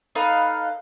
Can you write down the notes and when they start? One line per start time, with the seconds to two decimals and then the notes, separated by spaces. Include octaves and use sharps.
0.15 D#4 A4 B4 F5